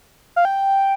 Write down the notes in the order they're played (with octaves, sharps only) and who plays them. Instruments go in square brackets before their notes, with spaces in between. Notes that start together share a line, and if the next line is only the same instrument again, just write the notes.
[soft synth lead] F5
G5